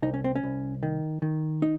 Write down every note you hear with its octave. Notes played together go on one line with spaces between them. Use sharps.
C2 D#4
C#4
C4
C#4
C2
D#3
D#3
D#4